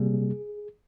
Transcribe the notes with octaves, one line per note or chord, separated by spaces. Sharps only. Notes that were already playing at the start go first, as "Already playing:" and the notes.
Already playing: C3 G3 A#3 G#4